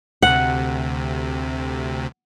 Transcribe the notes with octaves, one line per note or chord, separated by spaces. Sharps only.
D2 C3 F#5